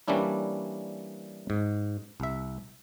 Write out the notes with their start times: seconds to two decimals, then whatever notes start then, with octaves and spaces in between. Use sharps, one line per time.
0.08 E3 G3 A#3 C#4 D4 E4
1.50 G#2
2.20 C2 E5